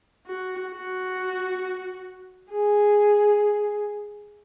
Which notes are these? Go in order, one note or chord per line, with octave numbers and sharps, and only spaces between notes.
F#4
F#4
G#4